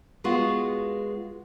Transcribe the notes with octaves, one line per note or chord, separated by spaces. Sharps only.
G#3 B3 F4 F#4